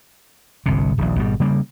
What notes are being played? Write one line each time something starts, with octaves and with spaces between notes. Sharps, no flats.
G1 C2 C3
D#1 A#1
G#1 B2 G3
C#3 G3 A#3